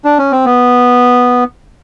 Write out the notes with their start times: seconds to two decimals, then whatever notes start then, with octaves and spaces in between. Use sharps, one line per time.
0.05 D4
0.18 C#4
0.32 C4
0.45 B3